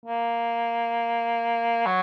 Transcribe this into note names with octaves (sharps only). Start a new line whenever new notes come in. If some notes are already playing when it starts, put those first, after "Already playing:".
A#3
F#3